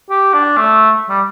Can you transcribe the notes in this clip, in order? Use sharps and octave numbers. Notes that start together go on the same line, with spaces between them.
G4
D4
A3
G3